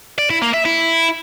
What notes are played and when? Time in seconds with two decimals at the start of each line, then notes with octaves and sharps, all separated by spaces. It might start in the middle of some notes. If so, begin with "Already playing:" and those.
0.19 D5
0.30 E4
0.42 A#3
0.54 E5
0.65 E4